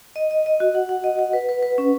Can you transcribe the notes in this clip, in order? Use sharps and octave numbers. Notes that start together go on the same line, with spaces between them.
D#5
D#5
D#5
F#4
F#5
F#5
D#5
F#5
B4
B4
B4
C#4